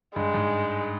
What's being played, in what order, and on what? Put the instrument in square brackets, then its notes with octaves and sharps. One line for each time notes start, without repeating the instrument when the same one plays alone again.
[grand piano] G2 [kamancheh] G#3
[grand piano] G#2